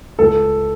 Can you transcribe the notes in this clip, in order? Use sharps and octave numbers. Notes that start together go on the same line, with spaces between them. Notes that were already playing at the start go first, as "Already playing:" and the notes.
C#2 A4